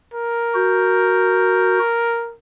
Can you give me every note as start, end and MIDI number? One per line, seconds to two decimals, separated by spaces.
0.14 2.34 70
0.55 1.79 66
0.55 1.79 91